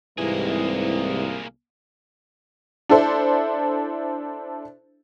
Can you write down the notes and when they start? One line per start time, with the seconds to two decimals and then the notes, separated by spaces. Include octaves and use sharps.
0.18 C2 G#2 C3 E3 A#3 G#4
2.89 D4 E4 A4 C5